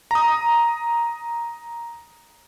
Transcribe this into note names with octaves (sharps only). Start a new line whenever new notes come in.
A#5 D#6